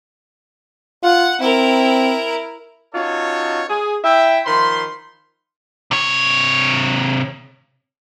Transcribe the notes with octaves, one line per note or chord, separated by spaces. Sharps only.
F4 F#5
C4 E4 A#4
C#4 D#4 F4 F#4 A4 C#5
G#4
E4 E5 G5
D#3 F3 B5 C6
C3 C#5